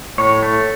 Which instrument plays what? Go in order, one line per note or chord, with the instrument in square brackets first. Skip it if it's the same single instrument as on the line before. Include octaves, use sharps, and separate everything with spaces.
[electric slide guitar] A2 C#5
A3